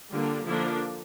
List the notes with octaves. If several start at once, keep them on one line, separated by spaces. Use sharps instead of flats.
D3 G3 A#3 D4 F4
D3 F3 A#3 D4 E4